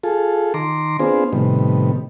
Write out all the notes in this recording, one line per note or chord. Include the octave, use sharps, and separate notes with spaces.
F4 G#4 A4
D#3 A#5 C6 D6
B3 C4 D4 F4 G#4 C5
A2 C3 D#3 G3 B3